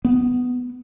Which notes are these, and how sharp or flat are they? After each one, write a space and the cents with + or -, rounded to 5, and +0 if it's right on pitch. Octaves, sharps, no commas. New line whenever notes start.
B3 +5